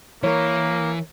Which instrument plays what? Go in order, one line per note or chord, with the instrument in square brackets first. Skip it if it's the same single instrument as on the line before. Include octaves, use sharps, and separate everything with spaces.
[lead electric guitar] E3 [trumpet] A#3 [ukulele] A#4 C#5